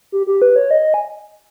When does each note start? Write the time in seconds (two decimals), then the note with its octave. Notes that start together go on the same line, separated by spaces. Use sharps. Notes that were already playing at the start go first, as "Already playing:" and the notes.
0.12 G4
0.27 G4
0.42 B4
0.56 C#5
0.71 D#5
0.94 G#5